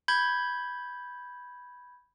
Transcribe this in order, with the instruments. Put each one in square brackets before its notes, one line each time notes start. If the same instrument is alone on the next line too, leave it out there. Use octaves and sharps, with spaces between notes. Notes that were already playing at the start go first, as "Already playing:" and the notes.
[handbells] B5 G6 G#6